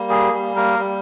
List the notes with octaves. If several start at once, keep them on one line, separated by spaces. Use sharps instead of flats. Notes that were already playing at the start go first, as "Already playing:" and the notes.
Already playing: G3 A#3
G#4
G3
A#3 A#4
G3